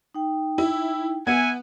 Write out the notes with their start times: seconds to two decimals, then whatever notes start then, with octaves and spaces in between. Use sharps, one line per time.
0.15 D#4 G5
0.58 E4
1.27 B3 E5 F#5 G#5